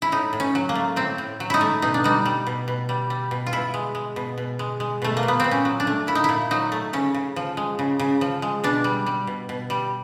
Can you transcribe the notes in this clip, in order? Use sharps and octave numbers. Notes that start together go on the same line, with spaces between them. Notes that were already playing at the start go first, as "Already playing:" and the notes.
E4
A2 D#4
A2
C#4
F#3
A#3
A3
A2 C4
A2
F#3
D#4 E4
A3
B2 D#4
D4
G3 D#4
G3
B2
B2
G3
G3
B2
F4
B2 E4
G#3
G#3
B2
B2
G#3
G#3
B2 A3
A#3
A#2
B3
A#2 C4
C#4
F#3
D4
A3
A#2 E4
D#4
A#2 E4
F#3 D#4
A3
C#3 C#4
C#3
F3
G#3
C#3
C#3
F3
G#3
B2 D4
G3
G3
B2
B2
G3